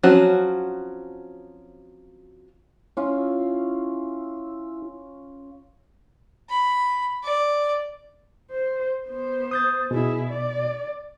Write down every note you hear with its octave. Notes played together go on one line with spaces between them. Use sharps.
F3 F#3 C4 C#4 F#4
C#4 E4 F4
B5
D5
C5
B3 C5
D#6 G6 A6
B2 E4 G#4
D5